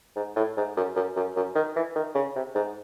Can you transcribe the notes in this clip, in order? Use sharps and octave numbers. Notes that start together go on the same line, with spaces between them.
G#2
A2
G#2
F#2
F#2
F#2
F#2
D#3
E3
D#3
C#3
C3
G#2